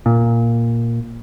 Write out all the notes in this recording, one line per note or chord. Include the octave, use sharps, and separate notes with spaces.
A#2